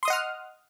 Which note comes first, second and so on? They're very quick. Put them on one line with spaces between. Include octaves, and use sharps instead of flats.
C6 D#6 D#5 F#5 F6